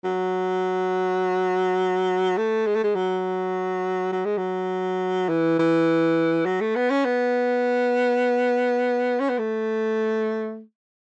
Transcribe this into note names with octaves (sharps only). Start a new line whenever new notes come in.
F#3
A3
G#3
A3
G#3
F#3
F#3
G#3
F#3
E3
E3
F#3
A3
B3
C#4
B3
C#4
B3
A3